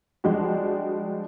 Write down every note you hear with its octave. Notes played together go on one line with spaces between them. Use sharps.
F3 G3 G#3 D4 F#4